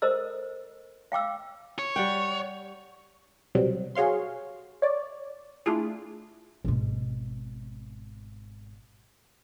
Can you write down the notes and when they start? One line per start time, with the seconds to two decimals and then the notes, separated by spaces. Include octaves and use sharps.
0.02 A4 A#4 C5 D#5 E6
1.12 F5 G5 D6 E6
1.79 C#5
1.96 G3 F#5 G5
3.55 C2 B2 F#3 G3 C4
3.95 F#4 G#4 C#5 F5 C6
4.82 C#5 D5
5.66 A3 D4 E4 F4 G#4
6.65 G#1 B2